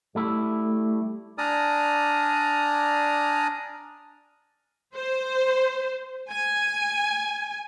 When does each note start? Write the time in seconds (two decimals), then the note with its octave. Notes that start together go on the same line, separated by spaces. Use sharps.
0.15 G3 A3 E4
1.38 D4 D5 G#5 A#5 D#6 F6
4.94 C5
6.32 G#5